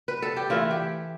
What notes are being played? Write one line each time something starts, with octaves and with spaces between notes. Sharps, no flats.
B4
A4
G4
E3 A3 E4 F4
G4